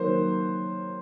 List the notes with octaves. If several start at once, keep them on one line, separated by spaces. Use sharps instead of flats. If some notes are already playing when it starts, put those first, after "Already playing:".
Already playing: D#3 F#3 A#3 C5